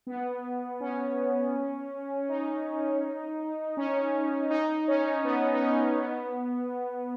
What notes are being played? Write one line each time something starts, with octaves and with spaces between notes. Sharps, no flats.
B3
C#4
D#4
C#4
D#4
C#4
B3
D#4
C#4
B3